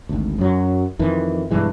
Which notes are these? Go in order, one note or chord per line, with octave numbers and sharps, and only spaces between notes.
G#1 D2
F#2 F#3
F2 D#3 E3
B1 G2 E3 G#3